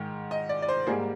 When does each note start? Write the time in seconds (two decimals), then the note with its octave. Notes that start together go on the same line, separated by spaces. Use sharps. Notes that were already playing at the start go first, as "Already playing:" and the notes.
Already playing: G#2 D#3 G#3
0.31 D#5
0.49 D5
0.62 D5
0.68 C5
0.86 G#2 G3 A#3 G#4